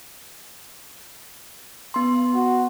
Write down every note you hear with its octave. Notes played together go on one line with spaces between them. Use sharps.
B3 C6
F#4